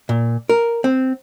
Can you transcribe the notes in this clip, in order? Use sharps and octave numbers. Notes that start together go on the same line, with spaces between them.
A#2
A#4
C4